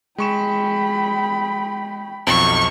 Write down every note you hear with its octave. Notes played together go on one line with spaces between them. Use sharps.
G#3 G5 B5 C#6 E7
B1 F2 C#6